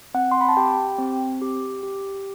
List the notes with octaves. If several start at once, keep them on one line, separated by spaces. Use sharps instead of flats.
C4 F#5
C6
B5
A5
G4 G5
C4
G4
G4